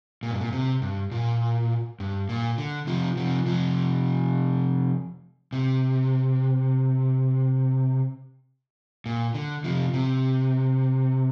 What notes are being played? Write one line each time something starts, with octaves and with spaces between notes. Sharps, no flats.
A#2
G2
A#2
C3
G2
A#2
G2
A#2
D3
C3 F3
C3 F3
C3 F3
C3
A#2
D3
C3 F3
C3